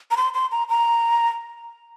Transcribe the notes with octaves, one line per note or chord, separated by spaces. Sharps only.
A#5
C6
C6
A#5
A#5